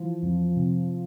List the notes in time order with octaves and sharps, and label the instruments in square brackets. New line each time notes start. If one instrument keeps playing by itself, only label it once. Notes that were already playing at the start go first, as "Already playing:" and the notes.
Already playing: [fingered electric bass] E3 [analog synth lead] F3
[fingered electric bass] F2
C3